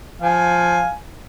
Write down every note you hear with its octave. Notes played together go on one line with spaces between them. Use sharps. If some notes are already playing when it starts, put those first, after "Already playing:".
F3 F5 G#5